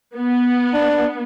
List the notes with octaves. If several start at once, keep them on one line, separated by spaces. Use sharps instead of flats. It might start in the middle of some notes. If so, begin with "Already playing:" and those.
B3
D4